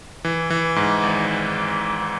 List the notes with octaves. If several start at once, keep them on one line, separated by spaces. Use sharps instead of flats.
E3
E3
G#2
G#1